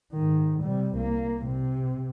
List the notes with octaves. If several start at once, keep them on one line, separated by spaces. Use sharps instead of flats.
G#2 D#3
C3 G3
C2 A#3
C3